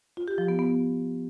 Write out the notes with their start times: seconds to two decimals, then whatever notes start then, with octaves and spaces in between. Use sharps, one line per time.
0.17 F4
0.28 G4
0.38 F3
0.48 B3
0.59 B3